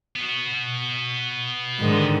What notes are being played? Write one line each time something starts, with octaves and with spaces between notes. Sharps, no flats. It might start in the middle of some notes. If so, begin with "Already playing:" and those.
B3 F#4
G#2 D3 D#3